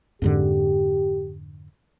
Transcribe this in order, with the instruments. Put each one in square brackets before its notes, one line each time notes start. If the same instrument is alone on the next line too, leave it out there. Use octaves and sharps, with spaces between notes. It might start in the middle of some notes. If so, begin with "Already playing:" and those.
[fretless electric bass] F2 G#2 D3 [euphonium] G4